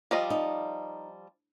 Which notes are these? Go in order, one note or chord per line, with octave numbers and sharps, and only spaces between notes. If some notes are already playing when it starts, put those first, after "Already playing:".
F3 G3 D#5
D#4